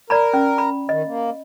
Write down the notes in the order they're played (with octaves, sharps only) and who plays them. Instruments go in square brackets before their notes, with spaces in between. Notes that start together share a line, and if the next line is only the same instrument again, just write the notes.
[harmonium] A#4 [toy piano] D5 A#5 B5
[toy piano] C#4
B5
[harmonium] D#3 [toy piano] D#5
[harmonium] A#3